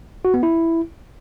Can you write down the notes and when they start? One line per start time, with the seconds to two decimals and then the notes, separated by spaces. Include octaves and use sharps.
0.25 F#4
0.34 B3
0.43 E4